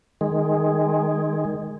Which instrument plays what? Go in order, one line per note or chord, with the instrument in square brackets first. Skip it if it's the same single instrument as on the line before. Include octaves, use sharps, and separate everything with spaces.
[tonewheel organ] D#3 G#3